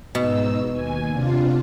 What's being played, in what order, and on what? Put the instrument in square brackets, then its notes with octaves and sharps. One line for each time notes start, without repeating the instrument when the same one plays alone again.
[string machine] G#2 D#4 E6 [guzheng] B2
[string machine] D#2 G#5
C3 D4 F4